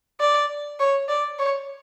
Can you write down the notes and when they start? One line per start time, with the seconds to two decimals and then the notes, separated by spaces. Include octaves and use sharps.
0.20 D5
0.80 C#5
1.08 D5
1.39 C#5